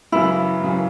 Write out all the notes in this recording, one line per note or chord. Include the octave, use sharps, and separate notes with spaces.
F#2 C#3 E3 E4
F#2 C#3 E3